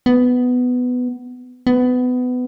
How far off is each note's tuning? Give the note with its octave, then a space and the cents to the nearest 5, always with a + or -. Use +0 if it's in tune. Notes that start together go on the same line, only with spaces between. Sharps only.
B3 +10
B3 +20